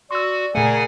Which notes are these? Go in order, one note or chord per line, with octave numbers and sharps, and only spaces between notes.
F#4 D5 C6 E6
A#2 C#3 A3 G#4 A#4 F#5 G#5